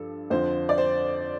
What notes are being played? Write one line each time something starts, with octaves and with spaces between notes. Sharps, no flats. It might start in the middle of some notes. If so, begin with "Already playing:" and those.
Already playing: G2 F3 A4
F2 D3 F3 C5
D5
C5